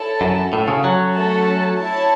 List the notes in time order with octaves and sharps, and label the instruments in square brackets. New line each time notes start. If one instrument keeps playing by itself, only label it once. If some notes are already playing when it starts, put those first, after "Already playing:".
Already playing: [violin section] E4 A4 C#5 A5
[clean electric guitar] F#2
[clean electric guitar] A2 [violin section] C#4 F#4 A4
[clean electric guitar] C#3
F#3
[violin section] A3 C#4 A4 F#5 A5
E4 C#5 A5